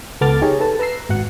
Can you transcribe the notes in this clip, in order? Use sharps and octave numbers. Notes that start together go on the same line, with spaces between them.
C#2 B3 A4 D6 F6 A6
D#4 G4 G#4 C#5 D#5
A4 B4 A5
B4 A#5 E6 C7
G#1 F#4 F#5